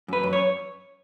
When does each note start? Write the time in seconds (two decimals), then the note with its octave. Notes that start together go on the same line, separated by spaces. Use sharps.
0.08 F#2 B4
0.23 F#2
0.33 C#5